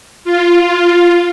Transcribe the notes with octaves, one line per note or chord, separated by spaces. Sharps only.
F4